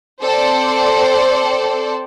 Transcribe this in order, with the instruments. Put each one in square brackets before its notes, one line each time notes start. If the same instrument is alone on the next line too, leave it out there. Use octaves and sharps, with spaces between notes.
[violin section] C4 A4 C5 D5